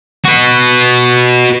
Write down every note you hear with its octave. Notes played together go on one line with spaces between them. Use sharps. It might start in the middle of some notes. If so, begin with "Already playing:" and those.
F#4 B4